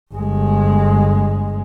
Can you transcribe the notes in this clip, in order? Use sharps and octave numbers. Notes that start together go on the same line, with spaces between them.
G1 G#3